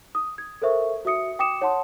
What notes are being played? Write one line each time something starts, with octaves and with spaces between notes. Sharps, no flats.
D#6
G#6
A4 A#4 C5 E5 C#6
F#4 E5 D#6 C#7
G5 D6 D#6 C#7 E7
C#5 F#5 A5 C6